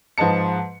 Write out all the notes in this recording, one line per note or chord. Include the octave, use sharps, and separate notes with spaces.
G#2 F3 B4 D#5 A5 C#7